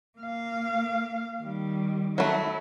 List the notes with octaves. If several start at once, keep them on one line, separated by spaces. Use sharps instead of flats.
A#3 F5
D#3 G3
F#3 A3 E4